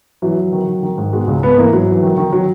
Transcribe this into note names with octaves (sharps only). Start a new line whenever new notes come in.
E3 F#3
E3
D#3
D#3
D#3
G#2
B2 G#3
C#2
G#2 B3
E3 A#3
G#2 F#3
E3
D#3
D#3
D#3 F#3